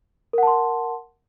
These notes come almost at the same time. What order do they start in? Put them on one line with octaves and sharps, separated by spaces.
A#4 F#5 A5 C6